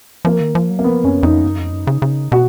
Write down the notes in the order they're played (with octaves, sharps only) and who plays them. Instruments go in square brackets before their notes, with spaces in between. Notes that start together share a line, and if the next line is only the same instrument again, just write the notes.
[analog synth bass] F3 [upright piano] A#3
[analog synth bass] D#3
F3
F#3
[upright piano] A#3
[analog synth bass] F3 [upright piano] B3
[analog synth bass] F#2 [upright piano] C#4
[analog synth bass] F2 [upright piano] D#4
[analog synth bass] F#2
F2
F#2
C#3
C#3
[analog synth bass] B2 [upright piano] F#4